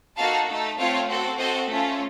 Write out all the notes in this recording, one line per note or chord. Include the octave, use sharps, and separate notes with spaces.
A#3 D#4 F#4 A4 F5 A5
A3 D#4 A4
A3 C4 F4 C#5 F5
C4 F#4 A4
C4 F#4 A4 C5 D#5
A3 C#4 F4